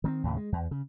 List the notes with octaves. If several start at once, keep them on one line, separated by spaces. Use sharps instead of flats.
D#3 B3 C4
D#2 A2 C#3
G#3
E2
C#3